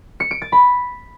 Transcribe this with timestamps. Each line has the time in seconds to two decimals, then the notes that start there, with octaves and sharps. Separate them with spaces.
0.20 C#7
0.31 D7
0.42 A6
0.52 B5